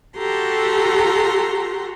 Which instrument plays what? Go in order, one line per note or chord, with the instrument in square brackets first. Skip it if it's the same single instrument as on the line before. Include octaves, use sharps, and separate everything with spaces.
[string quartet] F#4 G4 A4 A#5 C6